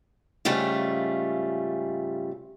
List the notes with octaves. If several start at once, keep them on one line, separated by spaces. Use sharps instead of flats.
G#2 C#3 G3 A3 F4